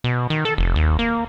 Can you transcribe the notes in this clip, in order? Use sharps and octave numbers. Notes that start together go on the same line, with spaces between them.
B2
D#3
A4
F1
D#2
A#3